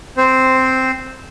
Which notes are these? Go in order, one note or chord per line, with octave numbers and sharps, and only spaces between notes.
C4 C5